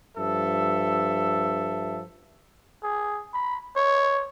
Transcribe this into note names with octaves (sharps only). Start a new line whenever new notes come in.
G2 F3 A4 E5
G#4
B5
C#5